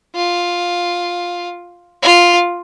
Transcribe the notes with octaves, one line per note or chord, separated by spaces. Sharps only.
F4
F4